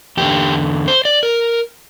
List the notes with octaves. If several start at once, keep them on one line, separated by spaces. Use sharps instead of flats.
E2 D3 G4
C5
D5
A#4